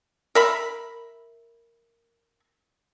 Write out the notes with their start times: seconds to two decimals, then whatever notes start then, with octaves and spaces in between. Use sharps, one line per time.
0.35 A#4 E5 B5